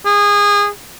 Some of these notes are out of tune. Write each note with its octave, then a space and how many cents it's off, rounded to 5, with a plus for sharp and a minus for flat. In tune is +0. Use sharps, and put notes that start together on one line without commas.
G#4 -25